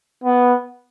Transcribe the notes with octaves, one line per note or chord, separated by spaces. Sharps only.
B3